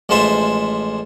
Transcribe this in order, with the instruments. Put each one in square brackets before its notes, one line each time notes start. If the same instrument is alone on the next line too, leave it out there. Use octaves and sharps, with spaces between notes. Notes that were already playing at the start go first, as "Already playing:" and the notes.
[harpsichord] A1 F3 G#3 A4 C5 E5